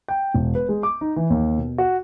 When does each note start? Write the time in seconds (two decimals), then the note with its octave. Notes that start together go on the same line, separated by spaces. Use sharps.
0.08 G5
0.34 E1
0.55 B4
0.69 G#3
0.83 D6
1.01 D#4
1.16 E3
1.30 D#2
1.58 B2
1.78 F#4